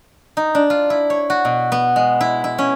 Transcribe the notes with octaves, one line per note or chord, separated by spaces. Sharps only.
D#4
D4
F4
E4
C#5
F#4
B2
B3
G#3
E4
E4
C#4